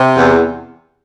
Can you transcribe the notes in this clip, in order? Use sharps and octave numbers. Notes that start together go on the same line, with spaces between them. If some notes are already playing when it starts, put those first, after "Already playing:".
Already playing: C3
E2